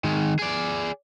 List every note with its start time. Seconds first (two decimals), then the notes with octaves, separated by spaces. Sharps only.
0.04 D#3 G#3
0.39 G#4 D5